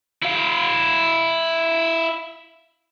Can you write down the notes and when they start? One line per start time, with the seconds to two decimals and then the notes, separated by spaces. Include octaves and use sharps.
0.22 E4 F5